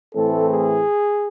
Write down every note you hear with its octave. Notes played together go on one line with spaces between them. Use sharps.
A2 E3 A3 C4 A4
G#4